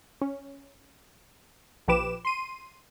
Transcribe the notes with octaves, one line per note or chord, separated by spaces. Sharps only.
C#4
A#1 F3 G4 B4 D6 E7
C6 D#7